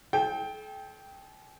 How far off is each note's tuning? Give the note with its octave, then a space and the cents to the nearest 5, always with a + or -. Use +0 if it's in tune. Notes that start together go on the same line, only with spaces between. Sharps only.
A4 -45 G5 +0